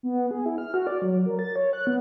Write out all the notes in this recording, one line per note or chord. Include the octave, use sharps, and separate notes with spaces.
B3
G#4
E4
F6
F#4
D5
F#3
A#4
A6
C#5
F#6
B3